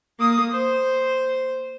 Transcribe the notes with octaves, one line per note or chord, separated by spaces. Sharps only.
A#3 D#6
C5